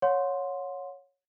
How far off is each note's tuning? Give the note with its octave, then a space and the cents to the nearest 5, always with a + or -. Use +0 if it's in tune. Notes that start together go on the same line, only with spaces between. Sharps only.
C#5 +0 F#5 -35 C6 +0